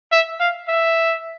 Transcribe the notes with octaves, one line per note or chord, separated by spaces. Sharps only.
E5
F5
E5